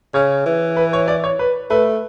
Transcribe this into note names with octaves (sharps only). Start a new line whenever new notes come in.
C#3 C#5
E3
B4
C#5
D5
C#5
B4
A3 B4